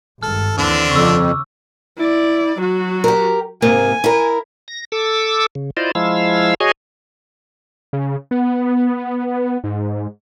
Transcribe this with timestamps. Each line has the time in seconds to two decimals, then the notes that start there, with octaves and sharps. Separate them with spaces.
0.23 G#1 G2 A4 F6
0.58 D#2 D3 E3 C4 D4
0.91 F2 C#3 C#6 D6 E6
1.98 E4 D5
2.59 F#3 F#4
3.04 G4 A#4
3.62 G#2 C3 A#3 G#5
4.04 E4 A#4
4.68 A#6
4.92 A4 D6 E6
5.55 C#3
5.77 E4 F4 C5 D5 D#5
5.95 F3 G#3 E4 F5 E6
6.60 F#4 G#4 C#5 D#5 G#5
7.93 C#3
8.31 B3
9.64 G#2